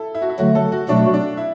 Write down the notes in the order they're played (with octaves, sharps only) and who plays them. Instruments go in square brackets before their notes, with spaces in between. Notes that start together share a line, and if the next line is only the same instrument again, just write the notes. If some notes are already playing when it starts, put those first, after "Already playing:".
Already playing: [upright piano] E4 A4
E4
F#4
E4
[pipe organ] D3 F#3 A3 [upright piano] F#4
[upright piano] A4
F#4
[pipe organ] B2 F#3 A3 F#4 [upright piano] D4
[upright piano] D4
E4